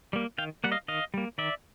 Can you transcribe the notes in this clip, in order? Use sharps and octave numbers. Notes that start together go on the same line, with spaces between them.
G3 A#3
D#3 F5 G5
G3 A#3 F#5
D#5 F5
D#3 D#5 F5
G3 A#3
D#3 D5 E5